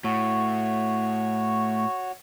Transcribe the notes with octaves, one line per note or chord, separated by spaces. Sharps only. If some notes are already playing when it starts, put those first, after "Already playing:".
A2 F#4 C#5